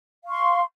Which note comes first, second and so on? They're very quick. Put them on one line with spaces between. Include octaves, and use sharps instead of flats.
F5 C#6 C6